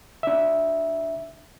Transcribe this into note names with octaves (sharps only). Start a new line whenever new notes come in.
D4 E5